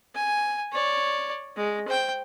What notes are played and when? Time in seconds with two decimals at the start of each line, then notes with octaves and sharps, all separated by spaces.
0.15 G#5
0.72 C#5 D5
1.57 G#3
1.88 C5 G5